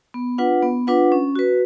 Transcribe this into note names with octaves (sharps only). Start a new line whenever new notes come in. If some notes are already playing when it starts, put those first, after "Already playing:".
B3
D4 F4 B4 F#5
B3
D4 F4 B4 F#5
C#4
F#4 B4